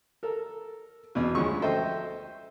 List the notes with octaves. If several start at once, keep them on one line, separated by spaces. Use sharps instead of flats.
A4 A#4
E2 B2
D2 F3 G#3 C#4 C#6
A4 C5 D#5 E5 G5